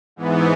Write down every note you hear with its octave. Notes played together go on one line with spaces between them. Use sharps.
G#2 E3 B3